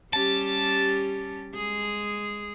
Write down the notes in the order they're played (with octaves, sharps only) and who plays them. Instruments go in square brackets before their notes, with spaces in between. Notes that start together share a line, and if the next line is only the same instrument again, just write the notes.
[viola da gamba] G3 C#4 G4 [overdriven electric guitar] A5
[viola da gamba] G#3 G#4